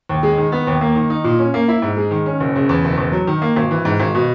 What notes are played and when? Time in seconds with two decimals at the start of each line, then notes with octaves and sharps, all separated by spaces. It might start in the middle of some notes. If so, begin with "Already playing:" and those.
0.09 D#2
0.23 G#3
0.38 D#3
0.52 B3
0.67 D#2
0.81 A#3
0.96 D#3
1.10 D#4
1.24 A#2
1.39 C#4
1.54 A#3
1.68 E4
1.82 G#2
1.97 G#3
2.11 D#3
2.26 C#4
2.40 F#1
2.56 C#3
2.69 E2
2.84 F#1
2.98 E2
3.12 F#3
3.27 D#3
3.42 A#3
3.56 G#1
3.71 E3
3.85 G#2
4.00 G#1
4.15 B2